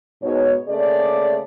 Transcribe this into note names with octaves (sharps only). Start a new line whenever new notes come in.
G#2 B2 C#5
C#3 A3 A#3 G#4 D5